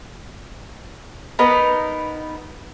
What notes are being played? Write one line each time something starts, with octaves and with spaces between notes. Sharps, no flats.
B3 D#4 A#4 B4